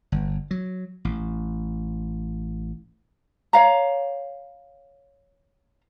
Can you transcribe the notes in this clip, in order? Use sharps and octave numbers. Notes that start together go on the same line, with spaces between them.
G1
F#3
A1
C#5 F5 A#5